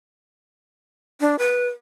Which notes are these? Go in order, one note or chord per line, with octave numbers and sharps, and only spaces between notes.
D4
B4